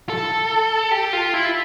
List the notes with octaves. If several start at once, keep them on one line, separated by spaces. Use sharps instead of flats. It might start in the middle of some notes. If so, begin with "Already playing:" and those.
A4
G4
F4
E4